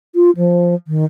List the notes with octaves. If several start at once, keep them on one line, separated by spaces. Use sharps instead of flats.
F4
F3
D#3